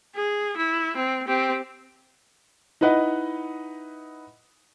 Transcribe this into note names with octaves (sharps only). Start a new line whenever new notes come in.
G#4
E4
C4
C4 G4
D#4 E4 B4 D#5 F#5